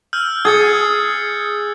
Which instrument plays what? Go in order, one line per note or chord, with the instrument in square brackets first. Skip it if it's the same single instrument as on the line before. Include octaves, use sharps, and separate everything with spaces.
[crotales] E6 F6 G6
[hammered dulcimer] G#4 [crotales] G#6 A6 C#7